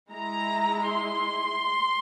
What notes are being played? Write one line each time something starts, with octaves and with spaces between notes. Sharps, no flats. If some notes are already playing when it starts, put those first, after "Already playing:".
G#3 E4 A#5
C6